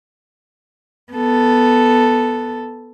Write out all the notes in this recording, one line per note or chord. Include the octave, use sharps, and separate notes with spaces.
B3 A4